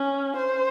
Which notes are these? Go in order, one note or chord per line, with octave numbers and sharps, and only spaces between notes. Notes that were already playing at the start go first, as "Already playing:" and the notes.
Already playing: C#4
C5